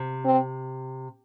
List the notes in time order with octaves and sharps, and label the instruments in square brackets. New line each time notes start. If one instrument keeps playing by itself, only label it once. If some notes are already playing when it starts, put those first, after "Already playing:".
Already playing: [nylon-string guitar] C3
[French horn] C4